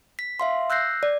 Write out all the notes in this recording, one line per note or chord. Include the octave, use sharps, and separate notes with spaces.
B6
E5 F5 C6
E6 F#6 G6 A#6 C7
D5